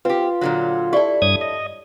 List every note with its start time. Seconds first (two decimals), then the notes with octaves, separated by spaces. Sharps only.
0.05 C4 F4 G4 B4
0.41 A#2 D3 F#3
0.93 E4 G4 A4 D5
1.22 G2 C#5 D#6 G#6
1.41 D#5